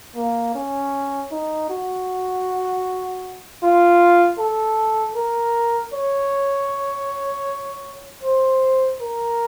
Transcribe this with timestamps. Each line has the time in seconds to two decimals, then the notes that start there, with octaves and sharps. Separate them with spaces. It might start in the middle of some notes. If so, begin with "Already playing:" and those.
0.16 A#3
0.55 C#4
1.31 D#4
1.69 F#4
3.63 F4
4.39 A4
5.16 A#4
5.93 C#5
8.23 C5
9.00 A#4